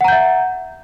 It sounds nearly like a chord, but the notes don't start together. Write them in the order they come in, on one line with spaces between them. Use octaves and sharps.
F#5 A#5 G6 E5